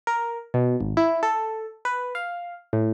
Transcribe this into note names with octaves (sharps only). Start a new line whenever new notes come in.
A#4
B2
G#1
E4
A4
B4
F5
A2